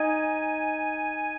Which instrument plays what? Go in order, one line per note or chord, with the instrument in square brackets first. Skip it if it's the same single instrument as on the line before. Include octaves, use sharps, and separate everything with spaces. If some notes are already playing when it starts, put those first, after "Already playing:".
Already playing: [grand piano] D#4 [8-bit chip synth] G#5